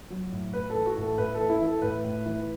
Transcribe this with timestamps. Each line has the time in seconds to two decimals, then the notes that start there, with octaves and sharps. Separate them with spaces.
0.10 F#3
0.32 A2
0.53 A2 B4
0.70 E3 A4
0.86 F#4
0.97 A2 A4
1.18 A2 B4
1.34 A4
1.39 E3
1.50 E4
1.61 E3
1.66 A4
1.82 A2 B4
2.04 A2
2.26 E3